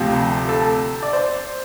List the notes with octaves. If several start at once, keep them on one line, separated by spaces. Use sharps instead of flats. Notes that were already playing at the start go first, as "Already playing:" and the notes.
Already playing: D2 C3 F3 G4
A4
D5
C5